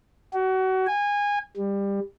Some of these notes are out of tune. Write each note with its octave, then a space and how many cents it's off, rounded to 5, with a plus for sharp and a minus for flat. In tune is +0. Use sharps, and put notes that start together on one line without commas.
F#4 +30
G#5 -20
G3 +20